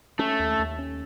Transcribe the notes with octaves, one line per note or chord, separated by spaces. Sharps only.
A3 C#4
D#2
D#2
C#4